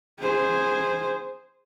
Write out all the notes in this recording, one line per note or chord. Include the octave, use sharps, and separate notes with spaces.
G#4 C5